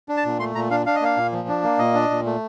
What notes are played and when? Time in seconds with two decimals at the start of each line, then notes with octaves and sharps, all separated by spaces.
0.09 D4
0.17 A5
0.25 A#2
0.40 A3 C6
0.55 A#2 A#5
0.71 D4 F5
0.86 D4 F5
0.95 D#5
1.02 A#3 F5
1.17 A#2
1.32 F3
1.48 D4
1.63 A#3
1.79 A#2 D#5
1.94 D4
2.10 A#2
2.26 A3